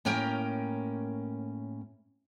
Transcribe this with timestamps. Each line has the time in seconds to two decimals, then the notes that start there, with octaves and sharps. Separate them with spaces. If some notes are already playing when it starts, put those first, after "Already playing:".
0.05 A2 A#3 C#4 A#4 G5